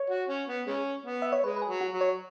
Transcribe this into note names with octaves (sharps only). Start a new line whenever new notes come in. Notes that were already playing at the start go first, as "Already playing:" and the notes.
Already playing: C#5
F#4
C#4
B3
G#3 C#4
B3
E5
C#5
G#3 B4
B4
G#4
F#3
F#4
F#3
C#5